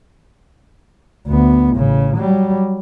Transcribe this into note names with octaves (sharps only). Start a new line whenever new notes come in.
D2 B3
A1 C#3
F#3 G3